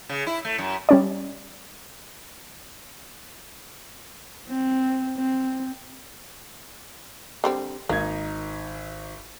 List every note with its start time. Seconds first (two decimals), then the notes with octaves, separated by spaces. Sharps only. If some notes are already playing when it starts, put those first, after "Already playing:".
0.09 C#3
0.26 E4
0.45 A3
0.58 F#2
0.89 G3 C#4 D5
4.48 C4
5.17 C4
7.44 D3 G3 C4
7.89 G#1 A#3 D#4 G#6